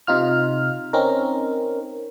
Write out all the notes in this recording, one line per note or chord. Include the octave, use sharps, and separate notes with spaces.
C3 D#4 F4 F6
C4 C#4 D#4 A#4